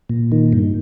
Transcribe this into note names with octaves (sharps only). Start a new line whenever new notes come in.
A#2
D#3
G2